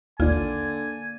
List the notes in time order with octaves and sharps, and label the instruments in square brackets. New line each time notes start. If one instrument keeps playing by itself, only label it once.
[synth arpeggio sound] A#1 D#2 F4 [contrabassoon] D3 [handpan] A#3 D5 [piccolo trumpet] G#5